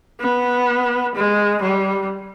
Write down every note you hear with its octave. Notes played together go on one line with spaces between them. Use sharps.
B3
G#3
G3